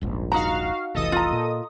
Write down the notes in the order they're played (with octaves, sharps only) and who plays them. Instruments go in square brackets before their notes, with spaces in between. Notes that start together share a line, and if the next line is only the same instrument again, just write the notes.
[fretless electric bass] D#1 A#1 G#2
[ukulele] D#4 A#5 [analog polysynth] F#4 F5
[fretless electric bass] F1 C2 E3 [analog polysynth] A4 D#5 D#6
[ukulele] F4 A#5
[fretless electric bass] A#2